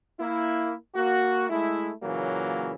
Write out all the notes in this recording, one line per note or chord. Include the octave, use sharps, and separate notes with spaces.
A#3 E4
A#3 F#4
G#3 A3 E4
A#2 C#3 E3 F#3 A#3